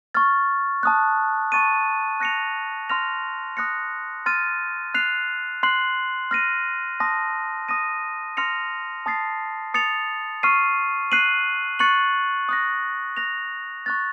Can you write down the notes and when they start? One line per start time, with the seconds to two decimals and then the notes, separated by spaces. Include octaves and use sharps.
0.14 C#6 F6 A6
0.83 A5 D#6 F#6
1.52 A5 C#6 A6 D#7
2.20 F#6 A#6 C#7 F7
2.89 C6 F6 A#6 F7
3.57 D#6 F#6 A#6 C#7
4.26 C6 F6 A6 D#7
4.94 F#6 C7 F7
5.63 C6 F#6 C7 F#7
6.31 F6 A#6 D#7
7.00 A5 C6 D#6 A#6
7.69 D#6 A#6 D#7
8.37 C6 F6 A#6 C#7 F7
9.06 A5 D#6 A6 C7
9.74 D#6 A6 C#7 F7
10.43 C#6 F6 C7 D#7
11.12 F#6 C7 D#7 F#7
11.79 C#6 F#6 A6 C#7 F#7
12.49 D#6 F#6 A#6
13.17 F#6 A#6 F7
13.86 C#6 F#6 A6